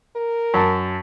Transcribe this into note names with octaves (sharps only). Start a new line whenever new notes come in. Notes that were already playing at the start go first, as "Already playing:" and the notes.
A#4
F#2 A5